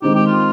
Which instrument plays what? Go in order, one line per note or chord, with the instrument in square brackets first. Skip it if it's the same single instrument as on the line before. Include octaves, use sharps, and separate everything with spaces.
[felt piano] D#3 G#3 C4 D#4 [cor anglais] G4
[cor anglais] G4
F4